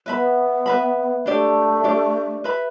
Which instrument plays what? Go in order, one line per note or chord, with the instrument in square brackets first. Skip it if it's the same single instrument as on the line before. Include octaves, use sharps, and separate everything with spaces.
[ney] B3 [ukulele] B4 E5 B5
[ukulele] B4 E5 B5
[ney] A3 [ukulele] D4 G4 D5
[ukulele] D4 G4 D5
B4 E5 B5